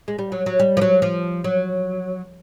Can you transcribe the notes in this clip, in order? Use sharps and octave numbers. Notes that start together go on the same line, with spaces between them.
G#3
G3
F#3
F#3
G3
F3
F#3
F3
F#3